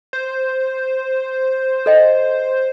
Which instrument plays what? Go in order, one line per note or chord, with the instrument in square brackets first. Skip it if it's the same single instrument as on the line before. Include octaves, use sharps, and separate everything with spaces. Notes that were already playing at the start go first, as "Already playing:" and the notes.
[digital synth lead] C5
[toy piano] A4 D#5 G5